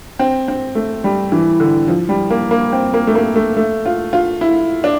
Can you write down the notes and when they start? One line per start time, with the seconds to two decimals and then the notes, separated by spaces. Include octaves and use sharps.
0.19 C4
0.48 C4
0.75 A3
1.04 G3
1.32 E3
1.60 D3
1.88 F3
2.09 G3
2.30 A#3
2.51 A#3
2.73 C4
2.94 A#3
3.07 A3
3.15 A#3
3.36 A3
3.57 A3
3.86 F4
4.13 F4
4.41 E4
4.84 D4